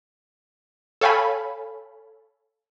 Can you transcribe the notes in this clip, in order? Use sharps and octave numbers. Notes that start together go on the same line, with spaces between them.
A4 C#5 F5 G5 G#5 B5